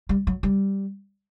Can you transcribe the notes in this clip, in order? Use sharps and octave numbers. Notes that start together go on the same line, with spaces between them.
G3
F#3
G3